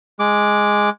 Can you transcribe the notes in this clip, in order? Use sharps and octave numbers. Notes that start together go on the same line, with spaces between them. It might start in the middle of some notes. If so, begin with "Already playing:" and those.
G#3 D6